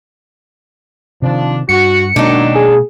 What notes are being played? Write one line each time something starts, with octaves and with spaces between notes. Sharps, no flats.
C3 D#3 F3 D4
G2 F#4 C#7
B2 D#3 F#3 G#3 A#3 D4 D#4
G#4